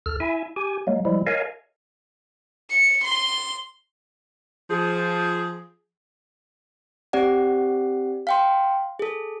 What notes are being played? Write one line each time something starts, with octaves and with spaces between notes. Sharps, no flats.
D#2 A4 F6
E4 E5 G#5
G4 G#5
F#3 G#3 A#3
F3 G3 G#3 E4
A#4 C#5 D#5 F5 G#5
C#7
C6
F3 G#4
C4 G4 D5 F#5
F5 G5 C6
G#4 A4